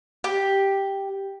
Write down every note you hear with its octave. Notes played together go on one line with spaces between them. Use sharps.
G4